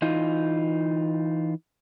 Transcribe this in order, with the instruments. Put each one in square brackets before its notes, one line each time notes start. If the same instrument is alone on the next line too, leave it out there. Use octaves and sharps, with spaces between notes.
[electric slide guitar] E3 D#4 F4